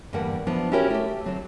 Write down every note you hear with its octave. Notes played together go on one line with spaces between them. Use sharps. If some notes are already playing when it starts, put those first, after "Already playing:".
E2 G2 D3 G3 A#3 F#5
F3 F#3 B3 D4 E4
C#4 E4 F#4 G4 A#4 C#5
A3 G4
D3 F#3 C4